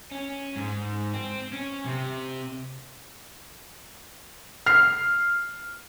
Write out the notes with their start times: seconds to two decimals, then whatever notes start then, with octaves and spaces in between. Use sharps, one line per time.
0.12 C#4
0.56 G#2
1.14 C4
1.52 C#4
1.86 C3
4.66 F6 C7